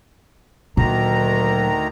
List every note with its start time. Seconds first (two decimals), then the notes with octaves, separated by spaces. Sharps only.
0.77 D2 A#2 D#3 F#3 A#5